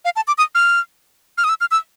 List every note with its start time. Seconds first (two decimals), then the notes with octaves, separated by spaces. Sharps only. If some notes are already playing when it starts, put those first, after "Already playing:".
0.05 F5
0.16 A5
0.27 D6
0.38 D#6
0.55 F6
1.38 F6
1.44 D#6
1.49 E6
1.61 F6
1.71 E6